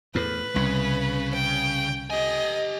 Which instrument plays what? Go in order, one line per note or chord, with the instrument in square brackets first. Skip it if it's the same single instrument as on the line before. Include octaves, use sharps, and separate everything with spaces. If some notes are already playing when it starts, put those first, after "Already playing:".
[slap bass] E2 A2 [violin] B4
[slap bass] C2 [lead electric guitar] C#3
[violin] G5
[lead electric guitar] G4 G#5 [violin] D#5